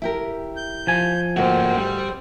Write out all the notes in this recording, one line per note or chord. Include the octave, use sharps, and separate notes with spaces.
E4 G4 A#4
G6
F3 G#5
D2 G#2 A#3 C4 F#4
G3